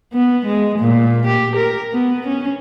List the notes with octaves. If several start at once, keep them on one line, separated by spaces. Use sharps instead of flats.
B3
G#3
A#2
G4
A#4
B3
C#4